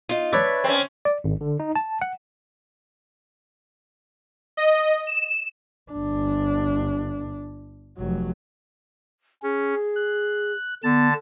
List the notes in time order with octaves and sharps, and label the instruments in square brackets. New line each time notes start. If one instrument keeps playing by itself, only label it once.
[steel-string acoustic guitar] D#4 F4
[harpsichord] D4 B4 C#5 [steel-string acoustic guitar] E5
[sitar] C4 C#4
[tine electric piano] D5
G#1
D3
D#4
A5
F#5
[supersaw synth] D#5
E7
[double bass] G1 D4
F1 F#3
[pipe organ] C#4 [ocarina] G#4
[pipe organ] F#6
[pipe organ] D3 A5 [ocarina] B3